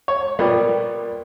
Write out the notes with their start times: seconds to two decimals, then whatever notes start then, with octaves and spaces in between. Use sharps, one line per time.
0.08 C#5
0.39 A#2 G3 B3 A#4 D5 G5